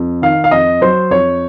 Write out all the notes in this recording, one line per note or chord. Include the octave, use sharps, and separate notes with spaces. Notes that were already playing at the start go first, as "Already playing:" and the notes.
Already playing: F2
D#3 F5
F5
F2 D#5
F#3 C5
F2 C#5